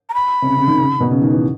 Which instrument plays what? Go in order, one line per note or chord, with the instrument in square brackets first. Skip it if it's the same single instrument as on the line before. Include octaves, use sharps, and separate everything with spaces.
[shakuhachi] A#5
B5
[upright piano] C3
C#3
C#3
D#3
C#3
B2
C#3
D#3
E3